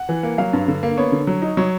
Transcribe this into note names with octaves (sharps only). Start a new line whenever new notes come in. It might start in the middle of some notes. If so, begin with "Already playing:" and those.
Already playing: F#5
E3
A#3
F#3 F5
G2
D3
A#3
B3 C#5
D3
F#3
D#4
F#3 C#5